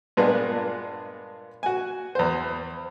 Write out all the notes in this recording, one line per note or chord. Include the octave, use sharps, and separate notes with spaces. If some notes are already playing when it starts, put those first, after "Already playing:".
G2 A#2 G#3 B3
F#4 G#5
E2 C5